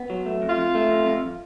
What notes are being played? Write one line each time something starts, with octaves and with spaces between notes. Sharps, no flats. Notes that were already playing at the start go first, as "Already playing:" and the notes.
Already playing: B3
F#3
A3
F2
F4
F2
A3
F2
F2